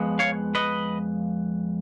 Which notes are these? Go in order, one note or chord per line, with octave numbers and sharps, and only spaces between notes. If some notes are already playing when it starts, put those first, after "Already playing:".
Already playing: F2 F3 G#3 B3
C#5 F5
B4 D#5